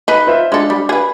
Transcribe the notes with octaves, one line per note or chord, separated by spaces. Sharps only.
D#4 B4
F4 C5 E5
G#3 D4 A4
G3
G#4 B4